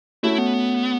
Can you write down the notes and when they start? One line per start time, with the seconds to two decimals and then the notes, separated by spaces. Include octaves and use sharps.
0.23 A3 C#4 E4 F#4
0.38 B3